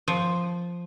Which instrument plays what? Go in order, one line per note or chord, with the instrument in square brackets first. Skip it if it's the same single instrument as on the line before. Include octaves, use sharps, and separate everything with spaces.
[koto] F3